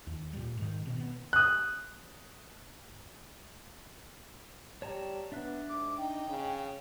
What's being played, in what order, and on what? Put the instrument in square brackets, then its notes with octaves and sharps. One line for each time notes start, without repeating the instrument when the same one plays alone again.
[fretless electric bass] D#2
A#2 G3
G#2 D#3
B2 D#3 C4
B3
[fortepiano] D#6 F#6
[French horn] G3 [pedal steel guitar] C#5 A5 A#5
[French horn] B3 [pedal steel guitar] D4 E5 F#6
[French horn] G#2 [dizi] D6
[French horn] D#4 [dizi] G5
[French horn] C#3